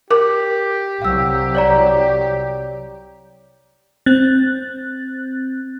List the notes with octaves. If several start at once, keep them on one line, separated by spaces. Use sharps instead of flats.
G4 A#4 D6
C2 F#3 F5 E6
C#5 D5 A#5
C4 F#6 A6